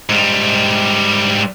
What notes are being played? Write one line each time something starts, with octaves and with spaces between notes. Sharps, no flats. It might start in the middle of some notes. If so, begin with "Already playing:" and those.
G#2 G3